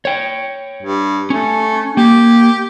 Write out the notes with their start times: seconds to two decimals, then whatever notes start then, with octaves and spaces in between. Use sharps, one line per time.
0.05 C#5 G5
0.83 G2
1.30 A3 C#4
1.97 A#3 G4